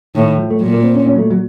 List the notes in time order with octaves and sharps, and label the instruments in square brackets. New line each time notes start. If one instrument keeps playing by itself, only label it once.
[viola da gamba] A2 [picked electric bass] D#3
[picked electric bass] F3
A3
[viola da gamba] A#2 [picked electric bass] F#3
[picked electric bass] A#3
C4
C#4
C#4
F#3
A3
F#3